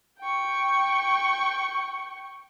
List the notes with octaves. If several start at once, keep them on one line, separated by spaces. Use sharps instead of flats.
G5 C#6